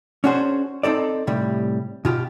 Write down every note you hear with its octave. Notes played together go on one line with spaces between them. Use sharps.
C#4 D4 F#4 G#4 C5
C4 D#4 A4 D5
A2 C3 G3
B2 F4 G4